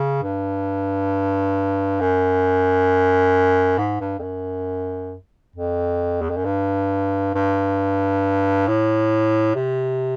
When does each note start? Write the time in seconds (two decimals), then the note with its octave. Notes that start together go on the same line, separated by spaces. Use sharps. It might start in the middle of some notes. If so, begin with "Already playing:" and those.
Already playing: C#3
0.23 G2
2.00 F#2
3.78 G#2
4.00 G2
4.19 F2
4.23 F#2
5.56 F2
6.22 E2
6.30 F2
6.37 F#2
6.45 G2
7.34 G2
8.68 A2
9.55 C3